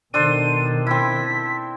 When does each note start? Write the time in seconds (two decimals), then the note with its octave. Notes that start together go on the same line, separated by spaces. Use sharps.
0.14 B2 D#3 D4 A4 C5 D#7
0.87 C4 E4 B6